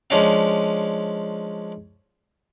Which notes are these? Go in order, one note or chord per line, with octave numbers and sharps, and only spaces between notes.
F3 G#3 C#4 D4 F5